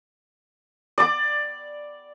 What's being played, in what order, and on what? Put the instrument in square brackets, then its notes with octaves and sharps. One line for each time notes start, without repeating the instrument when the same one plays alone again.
[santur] D5 D6